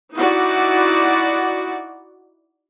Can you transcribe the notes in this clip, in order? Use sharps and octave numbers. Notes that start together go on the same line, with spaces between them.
D#4 E4 F#4 D5 F#5